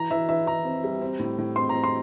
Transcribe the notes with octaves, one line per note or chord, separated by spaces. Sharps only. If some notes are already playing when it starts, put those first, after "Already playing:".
Already playing: E3 A#5
E3 E5
E3 E5
E3 A#5
C4
G3
C4
A2
A2
C4 C6
A#5
C4
C6